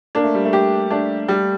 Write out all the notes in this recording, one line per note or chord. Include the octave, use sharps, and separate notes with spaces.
A#3 D4
A3
G3
A3
G4
A3 D4
G3